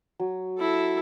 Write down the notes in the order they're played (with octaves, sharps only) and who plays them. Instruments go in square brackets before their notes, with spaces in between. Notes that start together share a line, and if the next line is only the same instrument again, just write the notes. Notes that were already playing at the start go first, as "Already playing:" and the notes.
[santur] F#3
[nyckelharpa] E4 A4